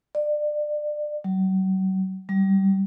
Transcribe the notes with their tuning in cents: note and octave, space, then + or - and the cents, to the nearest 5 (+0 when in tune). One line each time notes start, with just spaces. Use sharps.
D5 +25
F#3 +40
G3 -20